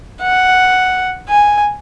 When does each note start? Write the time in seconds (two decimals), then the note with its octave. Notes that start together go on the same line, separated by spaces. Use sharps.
0.21 F#5
1.28 G#5